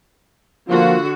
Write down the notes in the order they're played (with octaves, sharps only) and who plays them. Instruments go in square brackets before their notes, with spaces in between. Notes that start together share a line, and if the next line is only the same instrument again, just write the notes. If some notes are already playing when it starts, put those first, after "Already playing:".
[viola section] D3 F#4 [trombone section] F3 A#3 F4